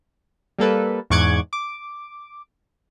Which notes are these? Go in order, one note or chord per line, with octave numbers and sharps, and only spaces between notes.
G3 A#3 A4 B4
E2 G#2 C#6 D6 F#6 G#6
D6